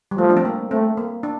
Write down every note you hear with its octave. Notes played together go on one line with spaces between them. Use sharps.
G3
F3 A3
D4
C4
A#3
A3 C4
A#3
D4